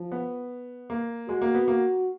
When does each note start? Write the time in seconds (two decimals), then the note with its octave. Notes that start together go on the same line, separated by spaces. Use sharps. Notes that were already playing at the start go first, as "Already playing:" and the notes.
Already playing: F3
0.12 B3
0.90 A#3
1.28 G#3 F#4
1.42 A#3
1.55 B3
1.68 A#3